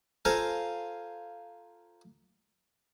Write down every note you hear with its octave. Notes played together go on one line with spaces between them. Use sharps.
F4 A4 C5 F5 G#5 A#5